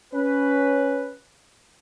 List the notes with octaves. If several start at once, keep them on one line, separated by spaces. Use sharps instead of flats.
C#4 B4